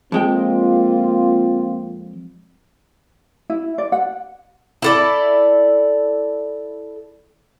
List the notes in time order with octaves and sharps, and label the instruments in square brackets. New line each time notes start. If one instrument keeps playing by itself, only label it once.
[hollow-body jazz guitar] F2 G#3 G5 [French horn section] A#3 C4 F4
[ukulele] E4
D5
F#5
[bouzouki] E4 A4 D5